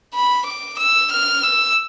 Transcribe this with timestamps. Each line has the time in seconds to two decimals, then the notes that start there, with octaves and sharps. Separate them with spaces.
0.14 B5
0.46 D6
0.79 E6
1.11 F6
1.43 E6